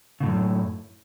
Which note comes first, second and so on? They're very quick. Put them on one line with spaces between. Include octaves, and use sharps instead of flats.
C#3 A2 F#2